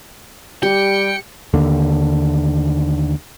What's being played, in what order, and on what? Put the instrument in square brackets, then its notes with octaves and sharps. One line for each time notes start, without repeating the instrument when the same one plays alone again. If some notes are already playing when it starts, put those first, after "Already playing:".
[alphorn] G3 [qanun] G4 [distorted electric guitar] G5 [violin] C#7
[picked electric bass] D#2 D3